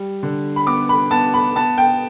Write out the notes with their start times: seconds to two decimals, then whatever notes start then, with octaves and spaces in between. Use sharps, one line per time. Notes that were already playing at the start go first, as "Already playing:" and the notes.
Already playing: G3
0.23 D3
0.56 B5
0.66 B3 D6
0.89 B5
1.11 B3 A5
1.34 B5
1.56 B3 A5
1.78 G5